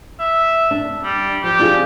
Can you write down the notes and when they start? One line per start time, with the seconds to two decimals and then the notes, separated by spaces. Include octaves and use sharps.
0.19 E5
0.71 D4
1.04 G3
1.43 F3 G4
1.59 D4 F4 G#4